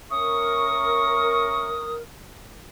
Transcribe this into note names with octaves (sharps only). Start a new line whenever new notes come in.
C#4 A#4 E5 C#6 D#6